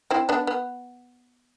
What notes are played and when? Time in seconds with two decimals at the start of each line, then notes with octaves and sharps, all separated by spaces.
0.11 C4 E4
0.29 B3 D4
0.47 B3